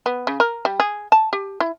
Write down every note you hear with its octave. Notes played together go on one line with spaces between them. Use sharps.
B3
C#3
A#4
G3
G#4
A5
G4
E4